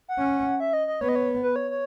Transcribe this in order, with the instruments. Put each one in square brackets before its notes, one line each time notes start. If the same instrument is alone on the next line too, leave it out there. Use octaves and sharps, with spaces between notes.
[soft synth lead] F#5
[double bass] C#4
[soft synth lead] E5
D#5
D#5
[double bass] B3 [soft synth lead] C#5
[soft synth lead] D#5
C#5
B4
C#5
C#5